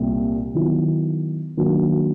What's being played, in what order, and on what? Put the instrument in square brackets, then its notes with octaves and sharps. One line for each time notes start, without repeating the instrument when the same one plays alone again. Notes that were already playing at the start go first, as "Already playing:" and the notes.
Already playing: [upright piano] C2 A#2 G3
D#3 F#3 B3 E4
D#3 F#3 A#3 D4 F#4